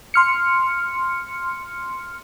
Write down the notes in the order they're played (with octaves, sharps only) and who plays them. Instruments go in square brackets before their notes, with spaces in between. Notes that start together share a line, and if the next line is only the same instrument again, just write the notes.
[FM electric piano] C6 F6 C#7